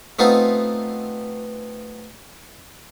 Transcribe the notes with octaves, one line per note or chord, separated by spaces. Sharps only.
A3 B3 C4 D#4 F4